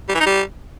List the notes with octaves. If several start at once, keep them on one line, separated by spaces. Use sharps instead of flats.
G3
E3
D#4
G3